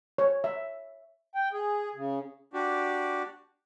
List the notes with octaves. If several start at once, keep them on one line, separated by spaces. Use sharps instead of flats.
C#5
E5
G5
G#4
C#3
D4 F#4 G4